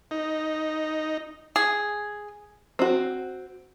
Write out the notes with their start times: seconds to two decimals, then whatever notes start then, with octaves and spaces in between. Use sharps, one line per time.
0.11 D#4
1.56 G#4
2.79 C4 F#4